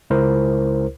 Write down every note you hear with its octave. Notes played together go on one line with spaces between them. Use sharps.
C#2 E4 A#4 C5